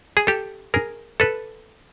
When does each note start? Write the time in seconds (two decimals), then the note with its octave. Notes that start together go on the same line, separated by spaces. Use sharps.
0.17 G#4
0.27 G4 A4
0.74 G#4 A#4
1.20 A4 B4